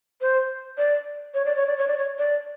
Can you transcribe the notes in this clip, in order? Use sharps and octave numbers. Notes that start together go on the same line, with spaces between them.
C5
D5
C#5
D5
C#5
D5
C#5
D5
C#5
D5